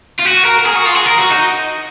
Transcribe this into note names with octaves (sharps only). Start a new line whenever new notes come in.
F4
F#4
A#4
A#4
G#4
F#4
F4
G#4
A#4
F#4
D#4